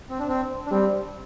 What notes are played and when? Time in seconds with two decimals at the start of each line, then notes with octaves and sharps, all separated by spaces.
0.10 C4
0.19 D4
0.28 C4
0.66 D4
0.71 G3 C4